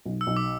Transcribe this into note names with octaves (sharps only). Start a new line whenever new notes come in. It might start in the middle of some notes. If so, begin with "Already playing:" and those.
B1
E6
B1
D6